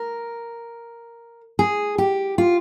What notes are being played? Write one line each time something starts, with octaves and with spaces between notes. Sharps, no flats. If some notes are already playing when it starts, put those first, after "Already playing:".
Already playing: A#4
G#4
G4
F4